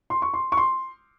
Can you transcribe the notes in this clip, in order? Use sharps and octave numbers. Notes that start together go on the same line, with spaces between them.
C6
C#6
C6
C#6
C6